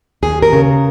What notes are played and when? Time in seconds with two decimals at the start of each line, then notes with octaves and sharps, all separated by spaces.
0.22 D#2 G#4
0.42 A#4
0.53 C#3